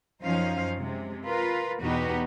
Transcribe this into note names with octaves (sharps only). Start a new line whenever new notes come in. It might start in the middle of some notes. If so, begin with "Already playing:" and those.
F#2 F3 C#4 D#4 C5 F5
C3 G#3
F4 A#4 B4
E2 B2 D#4 F#4 G4 B4